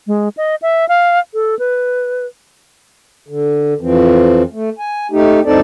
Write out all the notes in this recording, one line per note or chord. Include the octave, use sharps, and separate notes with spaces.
G#3
D#5
E5
F5
A4
B4
D3
F2 E3 F3 C4
A3
G#5
A3 D#4 G4
D2 G2 C4 D#4 A4 D5